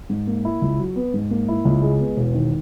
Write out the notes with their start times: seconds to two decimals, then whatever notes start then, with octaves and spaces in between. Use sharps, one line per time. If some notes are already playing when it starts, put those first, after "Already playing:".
0.10 G#2
0.27 A#3
0.45 E4
0.62 C#2
0.79 F#3
0.96 B3
1.14 G#2
1.31 A#3
1.48 E4
1.65 C#2
1.82 G#3
2.00 B3
2.17 E1
2.34 D#3